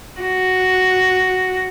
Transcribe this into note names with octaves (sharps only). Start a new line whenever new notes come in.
F#4